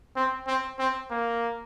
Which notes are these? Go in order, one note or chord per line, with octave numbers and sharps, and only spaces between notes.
C4
C4
C4
A#3